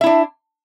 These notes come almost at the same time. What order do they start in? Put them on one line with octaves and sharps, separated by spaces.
E5 E4 D4